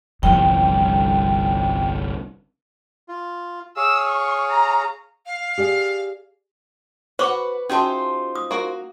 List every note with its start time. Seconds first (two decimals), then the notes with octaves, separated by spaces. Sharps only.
0.23 G1 C2 F3 G3 G5
3.08 F4
3.77 G#4 C#5 F5 E6
4.08 C#6
4.50 A#5
5.26 F5
5.58 G4 G#4 D5
7.19 F#4 B4 C5 F#5 C#6 D6
7.70 C#4 D#4 F4 F#4 G#4 C5 E5 A5
8.35 D#6
8.51 A#3 F#4